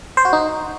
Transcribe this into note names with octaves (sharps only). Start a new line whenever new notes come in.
C5
F#4
D#4